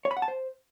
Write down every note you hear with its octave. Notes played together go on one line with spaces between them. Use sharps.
C#5
B5
F#5
A5
C5